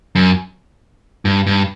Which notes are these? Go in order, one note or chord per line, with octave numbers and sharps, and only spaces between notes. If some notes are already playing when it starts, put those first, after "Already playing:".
F#2
G2
G2